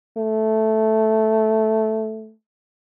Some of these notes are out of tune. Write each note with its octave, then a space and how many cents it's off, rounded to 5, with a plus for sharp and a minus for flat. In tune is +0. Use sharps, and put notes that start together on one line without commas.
A3 -5